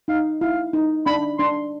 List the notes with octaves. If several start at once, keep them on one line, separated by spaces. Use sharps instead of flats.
D#4 F5
E4 F5
D#4
D4 B5
D4 C6